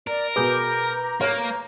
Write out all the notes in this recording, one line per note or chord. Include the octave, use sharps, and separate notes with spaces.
A#4 D5
B2 G#4 B4 A#5 D6 G6
A#3 C#5 F6